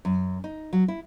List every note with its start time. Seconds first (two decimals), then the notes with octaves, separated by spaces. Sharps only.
0.05 F#2
0.44 D#4
0.73 F#3
0.88 E4